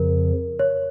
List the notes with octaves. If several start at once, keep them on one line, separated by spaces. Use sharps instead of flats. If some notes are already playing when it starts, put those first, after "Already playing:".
Already playing: F2 C#3 F3 A#4
C#5